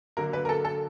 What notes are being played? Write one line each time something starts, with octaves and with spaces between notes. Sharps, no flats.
D3 F#3 A#3 A#4
B4
A#4
A4
A4